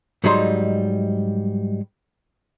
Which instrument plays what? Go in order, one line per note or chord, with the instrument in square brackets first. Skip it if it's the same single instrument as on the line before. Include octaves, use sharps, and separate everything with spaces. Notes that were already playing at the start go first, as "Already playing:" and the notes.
[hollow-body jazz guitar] G#2 F#3 G3 D#4 B5 C6